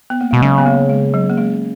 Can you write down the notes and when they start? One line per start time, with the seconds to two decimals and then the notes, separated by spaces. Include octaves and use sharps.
0.10 B3
0.21 A#3
0.31 B2 G#3
0.41 C#3 F#3
0.58 B3
0.66 A#3
0.89 G#3
1.14 F#3
1.30 A#3
1.38 G#3